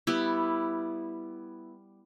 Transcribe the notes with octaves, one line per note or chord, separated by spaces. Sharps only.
G3 B3 E4